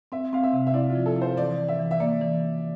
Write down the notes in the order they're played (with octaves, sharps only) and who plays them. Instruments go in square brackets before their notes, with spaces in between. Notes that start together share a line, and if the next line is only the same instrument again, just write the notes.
[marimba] C4 [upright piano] E5
[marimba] C4 [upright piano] F5
[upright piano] E5
[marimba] C3
[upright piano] E5
[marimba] E4 [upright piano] D5
[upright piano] F4
[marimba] F3
[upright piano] A4
[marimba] E4
[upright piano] C5
[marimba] E3 [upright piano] D5
[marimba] E3
[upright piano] E5
[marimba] E3
[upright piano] E5
[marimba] A#3 [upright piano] D5
[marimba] E3